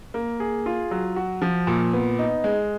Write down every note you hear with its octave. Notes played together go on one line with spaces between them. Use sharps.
A#3
G#4
F4
F#3
F#4
F3
A#2
B3
D#4
G#3